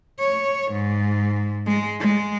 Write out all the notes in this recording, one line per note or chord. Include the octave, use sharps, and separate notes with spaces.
C#5
G#2
G#3
G#3